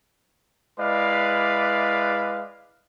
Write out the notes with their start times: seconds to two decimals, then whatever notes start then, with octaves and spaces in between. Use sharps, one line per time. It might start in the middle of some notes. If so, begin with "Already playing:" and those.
0.79 G#3 E4 B4 D5 F5